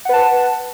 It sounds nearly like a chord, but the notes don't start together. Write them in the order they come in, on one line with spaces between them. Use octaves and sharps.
F#5 B4 A5